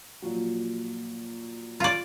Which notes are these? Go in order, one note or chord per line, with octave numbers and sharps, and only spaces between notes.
A#2 F3 F#3
F4 D5